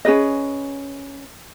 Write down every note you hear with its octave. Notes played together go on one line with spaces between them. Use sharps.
C#4 G#4 B4 D#5